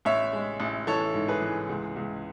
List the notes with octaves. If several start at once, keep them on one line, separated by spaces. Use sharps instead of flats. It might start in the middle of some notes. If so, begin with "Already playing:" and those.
A1 C#5 E5
G#3
A1
E3 A4 C#5
G#2
G#4 B4
E3
C#2
C#2